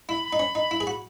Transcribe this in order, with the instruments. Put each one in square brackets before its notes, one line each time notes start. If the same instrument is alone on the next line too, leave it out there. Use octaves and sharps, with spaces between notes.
[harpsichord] E4 [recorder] B5
[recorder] B5
[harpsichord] D#4
C#4
D#4
E4
G#4
F#4